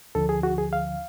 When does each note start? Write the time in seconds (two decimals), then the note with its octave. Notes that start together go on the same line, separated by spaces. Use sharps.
0.15 D2 D3 F3 A4
0.29 G#4
0.43 F#4
0.58 G#4
0.73 F5